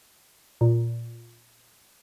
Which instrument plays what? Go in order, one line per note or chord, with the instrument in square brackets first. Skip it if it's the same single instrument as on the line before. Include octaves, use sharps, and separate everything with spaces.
[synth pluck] A#2